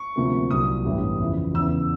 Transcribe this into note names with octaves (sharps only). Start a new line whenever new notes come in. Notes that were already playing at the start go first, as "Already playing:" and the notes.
Already playing: C#6
D2 C3 F3 A#3
C2 A#2 F#3 D#6
A1 G2 E3 G3 B3
F2 C#3 E3
E2 C#3 E3 E6